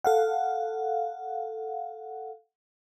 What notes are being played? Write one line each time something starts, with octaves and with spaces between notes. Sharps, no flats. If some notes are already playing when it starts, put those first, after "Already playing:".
A4 F5 F#5